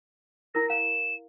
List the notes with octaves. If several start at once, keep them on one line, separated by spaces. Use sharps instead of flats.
E4 A#4 A#6
F5 E7